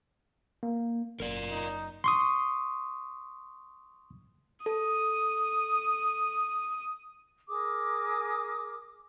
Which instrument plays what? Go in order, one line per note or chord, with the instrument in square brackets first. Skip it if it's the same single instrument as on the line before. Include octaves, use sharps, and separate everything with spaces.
[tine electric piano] A#3
[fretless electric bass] F#1 [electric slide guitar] A#4 D5
[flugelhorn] D#4
[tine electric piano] C6 C#6 D#6
[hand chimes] A4 [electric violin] D#6
[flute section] G#4 A#4 D6 D#6